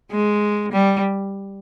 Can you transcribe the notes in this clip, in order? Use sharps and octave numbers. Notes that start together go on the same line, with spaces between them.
G#3
G3